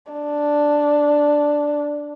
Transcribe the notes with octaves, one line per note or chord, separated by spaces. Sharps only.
D4